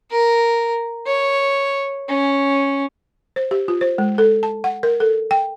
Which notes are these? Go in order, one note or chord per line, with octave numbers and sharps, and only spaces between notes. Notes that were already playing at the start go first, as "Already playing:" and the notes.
A#4
C#5
C#4
C5
G4
F4
C5
G#3
A4
A5
F#5
A#4
A4
G5